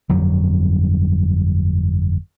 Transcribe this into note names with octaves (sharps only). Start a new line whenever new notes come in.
G1 F2 F#3 G3